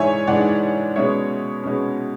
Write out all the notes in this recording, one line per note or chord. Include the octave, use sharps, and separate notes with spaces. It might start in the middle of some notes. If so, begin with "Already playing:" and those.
Already playing: G#2 E3 G#3 D4 C#5 E5 G#5
G#2 E3 G#3 D4 D5 F#5
B2 G#3 C#4 C#5 E5
B2 G#3 C#4